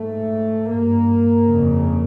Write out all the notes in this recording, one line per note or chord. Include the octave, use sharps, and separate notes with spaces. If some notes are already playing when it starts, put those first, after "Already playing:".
Already playing: G#2 A3
G2 A#3
F2 C#3